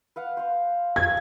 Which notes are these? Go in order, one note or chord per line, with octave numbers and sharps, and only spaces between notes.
B4 F5 F#5
C5 F5
F3 G#4 G#6